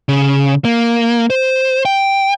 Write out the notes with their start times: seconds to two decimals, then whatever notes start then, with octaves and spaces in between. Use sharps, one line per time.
0.09 C#3
0.65 A#3
1.30 C5
1.85 G5